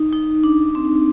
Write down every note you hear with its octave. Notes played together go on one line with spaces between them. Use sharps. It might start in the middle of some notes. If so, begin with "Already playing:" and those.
Already playing: D#4
D#4
D4
C4